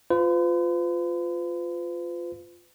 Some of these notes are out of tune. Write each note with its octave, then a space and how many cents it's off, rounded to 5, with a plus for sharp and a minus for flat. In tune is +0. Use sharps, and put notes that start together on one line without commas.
F4 +0 B4 +45